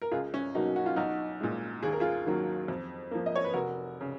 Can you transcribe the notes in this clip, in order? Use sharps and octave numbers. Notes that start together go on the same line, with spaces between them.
A#4
C#2 F4 G#4
C#4
B2 F#3 A#3 D#4
F#4
F4
B1 D#4 F#4
A#2 G#3
D#2 G#4
A#4
F4 G#4
D#3 F#3 A#3
F2
F3 A#3
D#5
C#5
B4
F1 F#4 A#4
C#3